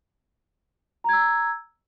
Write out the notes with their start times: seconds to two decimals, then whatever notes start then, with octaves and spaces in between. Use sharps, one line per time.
1.04 A#5
1.09 G#6
1.13 E6